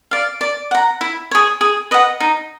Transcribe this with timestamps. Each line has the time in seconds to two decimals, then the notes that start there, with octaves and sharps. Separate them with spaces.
0.11 D5 F5
0.41 D5
0.71 F#5 A#5
1.01 E4
1.31 G#4 C#5
1.61 G#4
1.91 B4 D#5 F#5
2.20 D#4